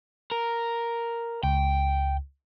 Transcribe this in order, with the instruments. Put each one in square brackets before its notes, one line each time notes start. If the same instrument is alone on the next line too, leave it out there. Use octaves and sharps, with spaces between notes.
[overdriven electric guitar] A#4
[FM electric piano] C#2 [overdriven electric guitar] G5